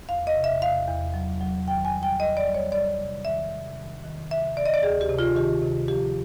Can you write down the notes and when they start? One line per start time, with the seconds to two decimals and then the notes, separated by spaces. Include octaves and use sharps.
0.09 E2 F5
0.27 D#5
0.35 C3
0.44 E5
0.61 E2 F5
0.88 E2
1.14 F#3
1.41 F#3
1.66 D#3 G5
1.85 G#5
1.94 G3
2.03 G5
2.19 E2 D#5
2.37 D5
2.46 G3
2.55 C#5
2.72 G3 D5
2.99 C3
3.25 D#3 E5
3.52 C3
3.78 D#3
4.04 D#3
4.30 C3 E5
4.57 D#3 D5
4.66 D#5
4.74 D5
4.83 D2 G#4
5.01 G4
5.09 C3
5.19 F4
5.36 D#3 G4
5.62 C3
5.88 F3 G4